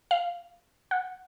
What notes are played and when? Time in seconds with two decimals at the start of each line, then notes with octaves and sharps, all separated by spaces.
0.11 F5
0.91 F#5